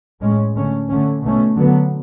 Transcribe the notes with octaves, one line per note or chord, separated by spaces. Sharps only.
A2 G#3 C#4
D3 A3 C#4
D3 A3 C#4
B2 A3 C#4
D3 F#3 B3